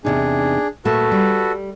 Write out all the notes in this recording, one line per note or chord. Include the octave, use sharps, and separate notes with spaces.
E2 C3 D4 D#4 G#4
A#2 A3 F#4 A4 B4 A5
G3